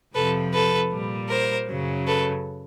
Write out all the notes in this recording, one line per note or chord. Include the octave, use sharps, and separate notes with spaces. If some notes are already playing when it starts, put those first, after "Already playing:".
F2 C3 F3 A4 B4
A4 B4
A#2 G3
A#4 C5
F#2 C#3 F#3
A4 B4